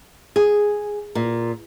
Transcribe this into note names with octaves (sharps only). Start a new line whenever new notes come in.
G#4
A#2